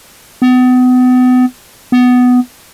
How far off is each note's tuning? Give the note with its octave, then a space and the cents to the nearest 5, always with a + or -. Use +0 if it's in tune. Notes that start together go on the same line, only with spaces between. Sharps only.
B3 +35
B3 +10